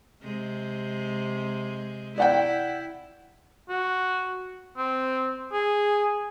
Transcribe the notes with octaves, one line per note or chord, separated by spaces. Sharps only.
C3 G#3
E4 D5 F#5 G5
F#4
C4
G#4